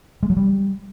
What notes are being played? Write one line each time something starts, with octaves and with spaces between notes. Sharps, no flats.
G#3
F#3
G3